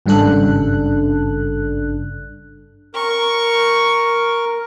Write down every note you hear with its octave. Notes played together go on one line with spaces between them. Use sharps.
G#1 G2 C#3 D4 A4 F#6
A#4 C#6